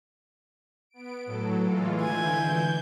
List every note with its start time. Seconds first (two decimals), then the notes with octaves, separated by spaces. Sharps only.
0.90 B3 D7
1.26 A2 F#3 A4
1.62 E3 G#3 F4
2.02 D3 E3 E4 G#5 G6